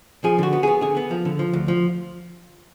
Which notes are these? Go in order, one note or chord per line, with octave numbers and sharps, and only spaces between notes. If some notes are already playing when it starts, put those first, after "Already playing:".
F3 G#4
D3 F#4
B3
B3 G#4
D3 G#4
B3
F3
D3
F3
D2
F3